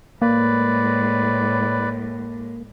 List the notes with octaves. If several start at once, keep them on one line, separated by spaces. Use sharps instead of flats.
A2 G#3 A#3 B4 D5